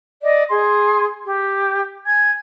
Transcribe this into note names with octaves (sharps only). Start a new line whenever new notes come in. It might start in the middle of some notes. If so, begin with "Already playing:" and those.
D5 D#5
G#4 C6
G4
G#5 G#6